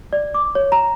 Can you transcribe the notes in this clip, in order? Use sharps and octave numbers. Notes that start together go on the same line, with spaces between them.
D5
D6
C#5
A#5